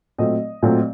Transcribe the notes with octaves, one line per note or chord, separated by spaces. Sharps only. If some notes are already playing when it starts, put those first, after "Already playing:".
A#2 F#3 A3 C4 D#5
A#2 F#3 A3 C4